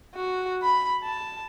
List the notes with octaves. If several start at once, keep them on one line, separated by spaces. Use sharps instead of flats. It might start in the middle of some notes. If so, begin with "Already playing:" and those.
F#4
B5
A5